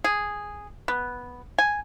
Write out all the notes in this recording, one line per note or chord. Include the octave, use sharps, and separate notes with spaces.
G#4
B3
G#5